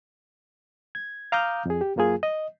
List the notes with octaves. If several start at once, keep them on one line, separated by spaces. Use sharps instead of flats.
G#6
F5 A#5 D6 D#6 F6 G6
F2 G#4
G4
F#2 F#3 A#3 F4 G#4
D#5